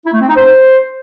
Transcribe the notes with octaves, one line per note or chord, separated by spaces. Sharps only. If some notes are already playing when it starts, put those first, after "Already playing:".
E4
A3
C4
D#4
C5